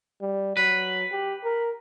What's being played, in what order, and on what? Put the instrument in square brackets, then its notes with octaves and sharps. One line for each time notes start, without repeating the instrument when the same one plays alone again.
[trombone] G3
[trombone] F#3 [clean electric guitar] B4
[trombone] G4
A#4